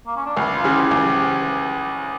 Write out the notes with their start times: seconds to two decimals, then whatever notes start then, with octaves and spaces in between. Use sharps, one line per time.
0.07 A#3
0.17 C#4
0.26 D4
0.37 C#2 E4
0.55 F4
0.64 C#3 E3
0.73 G4
0.91 C#2